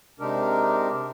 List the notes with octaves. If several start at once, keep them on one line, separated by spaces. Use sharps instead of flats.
C3 G#3 D4 D#4 G4 A#4